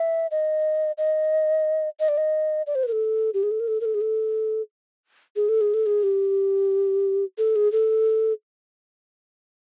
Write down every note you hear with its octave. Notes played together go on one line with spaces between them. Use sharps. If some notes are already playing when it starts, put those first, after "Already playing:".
Already playing: E5
D#5
D#5
D#5
D5
D#5
D5
C5
B4
A#4
A4
G4
G#4
A4
A#4
A4
A#4
A4
G#4
A4
G#4
A4
G#4
A4
G#4
G4
A4
G#4
A4